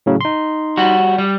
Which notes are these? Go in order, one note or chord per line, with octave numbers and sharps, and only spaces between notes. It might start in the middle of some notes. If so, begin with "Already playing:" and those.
A2 C#3 F#3
D#4 C6
G3 F#4
G3